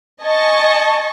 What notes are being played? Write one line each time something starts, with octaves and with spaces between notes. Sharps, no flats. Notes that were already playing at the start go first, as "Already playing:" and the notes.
D#5 G#5 A5 C#6